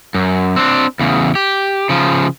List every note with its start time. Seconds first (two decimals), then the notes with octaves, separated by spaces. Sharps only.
0.14 F#2
0.56 C4 D4
1.00 E2 C#3
1.35 G4
1.89 C#3 F3